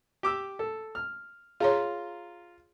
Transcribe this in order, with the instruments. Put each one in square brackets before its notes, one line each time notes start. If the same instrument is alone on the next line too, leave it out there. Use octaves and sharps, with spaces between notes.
[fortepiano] G4 D6 E6
A4
F6
[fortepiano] F4 A#5 C6 [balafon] G#4 C#5